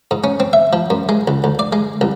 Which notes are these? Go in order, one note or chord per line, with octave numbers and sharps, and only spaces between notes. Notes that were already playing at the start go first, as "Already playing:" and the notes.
G#2
C#4
C4
E5
F3
F#2
G#3
C#2
D2
D5
G#3
C2